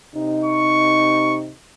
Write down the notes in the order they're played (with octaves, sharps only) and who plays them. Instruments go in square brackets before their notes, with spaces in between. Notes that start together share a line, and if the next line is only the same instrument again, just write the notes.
[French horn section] C3 D#4
[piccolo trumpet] C#6